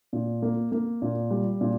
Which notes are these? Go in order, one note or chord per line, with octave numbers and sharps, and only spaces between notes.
A#2
A#3
A#3
A#2
G3
A#2